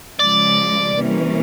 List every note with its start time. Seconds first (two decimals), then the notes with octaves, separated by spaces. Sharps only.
0.18 C#3 F3 G#3 D5
0.95 C3 E3 G3 A#3 C#4